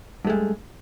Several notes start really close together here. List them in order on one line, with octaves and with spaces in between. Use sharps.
G2 A3 G#3